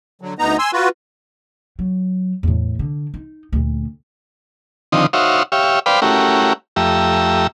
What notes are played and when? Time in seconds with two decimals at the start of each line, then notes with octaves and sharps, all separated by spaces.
0.22 D3 F#3
0.39 D2 B3 D#4 A#5
0.59 G#5 C6 E6
0.73 F4 F#4 B4
1.79 F#3
2.43 E2 A2
2.79 D3
3.14 D#4
3.53 D2 A#2
4.92 D3 D#3 F3 C4 D#4
5.13 D#4 F#4 C5 C#5 E5 F5
5.52 G4 C#5 E5 F5
5.86 B4 C5 D5 F5 G5 B5
6.02 A3 C#4 E4 F#4 G4 A#4
6.76 F2 A3 G4 E5 A#5